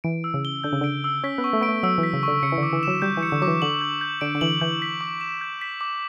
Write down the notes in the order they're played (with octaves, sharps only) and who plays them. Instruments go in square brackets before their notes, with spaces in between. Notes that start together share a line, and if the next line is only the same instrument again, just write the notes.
[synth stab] E3 [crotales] D7
[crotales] E6
[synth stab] C#3
[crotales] G7
[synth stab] D3 [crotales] G6
[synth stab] C#3
[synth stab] D3 [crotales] D7
[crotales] E6
[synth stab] C#4 [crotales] B6
[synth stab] B3
[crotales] C#6
[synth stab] A3
[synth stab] B3 [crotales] D7
[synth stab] A3
[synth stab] F#3 [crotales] E6
[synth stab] E3
[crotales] B6
[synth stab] C#3
[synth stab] D3 [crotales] C#6
[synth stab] C#3 [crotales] C#7
[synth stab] E3
D3
[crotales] D6
[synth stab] E3
[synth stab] F#3 [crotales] E7
[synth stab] G3 [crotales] G6
[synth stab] E3
[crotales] C#7
[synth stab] D3
[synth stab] F#3 [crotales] D6
[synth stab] E3
[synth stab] D3 [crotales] F#7
[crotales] G6
G6
[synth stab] D3 [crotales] D7
[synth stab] D3
[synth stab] E3 [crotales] F#7
[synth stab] E3 [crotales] G6
[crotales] B6
D6
E7
G6
B6
D6